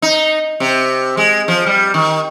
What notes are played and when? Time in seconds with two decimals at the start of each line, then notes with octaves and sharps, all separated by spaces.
0.02 D#4
0.60 C3
1.17 G#3
1.48 F3
1.66 G3
1.94 D#3